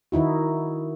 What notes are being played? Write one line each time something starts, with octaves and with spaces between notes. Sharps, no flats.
D#3 D#4 E4 F#4